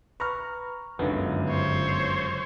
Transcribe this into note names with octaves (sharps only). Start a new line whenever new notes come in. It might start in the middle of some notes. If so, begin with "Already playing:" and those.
B4 A#5 C#6 F6
G1 C#2 F#2 D3 D#3 B3
C5 C#5